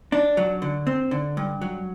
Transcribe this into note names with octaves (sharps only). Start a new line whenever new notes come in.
D4
F#3
D3
C4
D3
G2
F#3